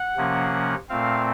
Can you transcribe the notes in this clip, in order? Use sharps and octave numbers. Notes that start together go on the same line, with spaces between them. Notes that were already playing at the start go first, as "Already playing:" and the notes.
Already playing: F#5
C3 F3 A#3 C#4
A#2 A3 C4 F5